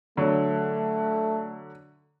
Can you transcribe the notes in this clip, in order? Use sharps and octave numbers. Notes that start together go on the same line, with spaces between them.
D3 F#3 A3